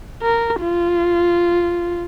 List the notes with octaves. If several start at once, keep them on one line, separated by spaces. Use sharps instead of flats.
A#4
F4